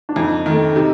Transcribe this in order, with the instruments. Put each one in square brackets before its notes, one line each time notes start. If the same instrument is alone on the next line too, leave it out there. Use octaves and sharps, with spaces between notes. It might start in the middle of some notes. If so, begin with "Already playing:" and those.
[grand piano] D4
[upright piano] F2 [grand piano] D#4
[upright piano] D#3 A3 [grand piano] D#4
[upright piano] C3 [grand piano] D#4